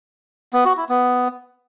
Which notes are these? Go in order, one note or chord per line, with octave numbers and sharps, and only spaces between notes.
B3
F#4
E4
B3